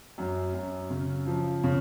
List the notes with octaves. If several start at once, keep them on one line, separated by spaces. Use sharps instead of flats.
F#2
F#2
C#3
F3
C#3